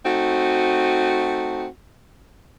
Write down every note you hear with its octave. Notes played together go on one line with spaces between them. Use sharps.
A3 C4 D#4 F#4